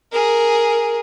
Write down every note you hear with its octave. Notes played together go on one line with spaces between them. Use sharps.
G#4 A#4